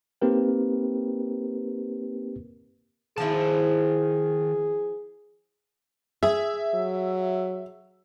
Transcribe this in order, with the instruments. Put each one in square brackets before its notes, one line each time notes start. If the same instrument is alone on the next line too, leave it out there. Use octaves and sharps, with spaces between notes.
[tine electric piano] A#3 C4 D#4 G4 A#4 B4
[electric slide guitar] D#3 A5 [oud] F3 E4 [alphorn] G#4
[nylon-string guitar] G#4 [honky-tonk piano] E5
[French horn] F#3